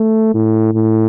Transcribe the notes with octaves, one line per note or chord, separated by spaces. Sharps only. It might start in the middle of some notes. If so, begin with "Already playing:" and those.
Already playing: A3
A2
A2